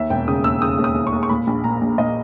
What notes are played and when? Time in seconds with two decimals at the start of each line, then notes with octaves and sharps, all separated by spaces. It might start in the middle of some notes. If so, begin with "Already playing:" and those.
Already playing: D#2 E5
0.10 E1 G5
0.28 C#3 D#6
0.44 D#2 E6
0.62 C#3 D#6
0.78 D#2
0.84 D#6
0.95 D#2
1.07 C#6
1.12 D#2
1.23 C#6
1.29 A#2 B5
1.47 A#1
1.64 A#2 A#5
1.81 A#1
1.98 A#2 D#5